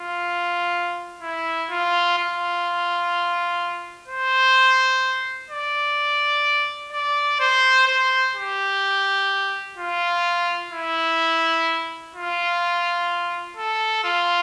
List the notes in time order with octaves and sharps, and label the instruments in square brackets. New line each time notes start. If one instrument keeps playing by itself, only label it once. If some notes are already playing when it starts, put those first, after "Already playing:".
Already playing: [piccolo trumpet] F4
E4
F4
F4
C5
D5
D5
C5
C5
G4
F4
E4
F4
A4
F4